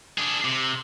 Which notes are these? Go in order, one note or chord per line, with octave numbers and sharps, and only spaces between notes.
D4 G#4
C3